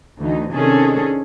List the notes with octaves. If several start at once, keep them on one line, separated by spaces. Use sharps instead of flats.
D2 E3 D#4
C3 D#3 C#4 D4 G#4 A4